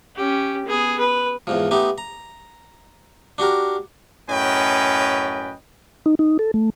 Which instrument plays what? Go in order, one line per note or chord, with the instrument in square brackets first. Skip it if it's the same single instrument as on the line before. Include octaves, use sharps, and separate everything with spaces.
[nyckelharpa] C#4 G4
B3 G#4
B4
[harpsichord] E2 G#2 F3
A3 B3 D#4 G4
A#5
D4 F#4 G4 A#4
[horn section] F#2 A2 C#4 B4 D#5 G5
[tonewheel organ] D#4
D#4
A4
A3